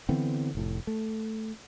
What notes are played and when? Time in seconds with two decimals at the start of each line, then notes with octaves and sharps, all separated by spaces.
0.09 D3 E3 B3 C4
0.55 F1 A2
0.87 A3